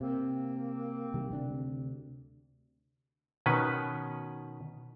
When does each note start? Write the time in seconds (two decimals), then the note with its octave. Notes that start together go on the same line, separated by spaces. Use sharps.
0.01 C3 A#3 C4
1.14 C3 D#3 G3
1.30 D2 C3 D4
3.46 B2 D#3 C#4 B4